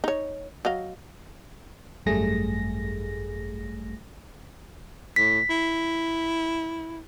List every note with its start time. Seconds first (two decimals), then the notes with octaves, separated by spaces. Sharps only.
0.04 D#4 C#5
0.65 F#3 D#5 F5
2.06 G#1 F#2 G3 A3 G#4 A#6
5.16 A2 B6
5.49 E4